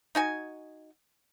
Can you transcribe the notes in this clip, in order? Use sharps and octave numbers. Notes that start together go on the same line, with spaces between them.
D#4 F#4 G#5